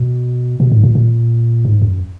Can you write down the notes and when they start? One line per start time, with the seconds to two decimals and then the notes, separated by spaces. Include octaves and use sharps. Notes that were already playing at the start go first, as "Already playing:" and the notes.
Already playing: B2
0.60 B2
0.72 G#2
0.83 A#2
0.95 A#2
1.65 G#2
1.82 F#2